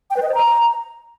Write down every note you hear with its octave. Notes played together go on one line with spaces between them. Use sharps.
G5
B4
D#5
C5
A#5